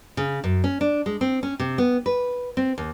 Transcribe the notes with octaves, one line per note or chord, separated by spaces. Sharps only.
C#3
F#2
C#4
D4
G#3
C4
C#4
C3
B3
B4
C4
D#2